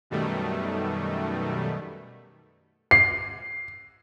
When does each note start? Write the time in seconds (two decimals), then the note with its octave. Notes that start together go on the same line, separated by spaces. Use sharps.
0.10 F#2 B2 D#3 G3 A3
2.91 C7